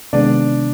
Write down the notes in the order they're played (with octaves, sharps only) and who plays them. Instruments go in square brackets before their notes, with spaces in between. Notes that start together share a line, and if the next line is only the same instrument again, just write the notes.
[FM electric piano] C3 D#3 G#3 B3 [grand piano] D4 D5